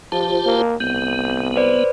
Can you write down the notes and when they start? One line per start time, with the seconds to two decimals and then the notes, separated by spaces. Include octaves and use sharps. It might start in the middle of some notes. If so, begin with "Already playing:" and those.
0.12 F3 F4 G4 C5 A5
0.45 A#3
0.80 C2 B3 G6
1.57 B4 C5 D5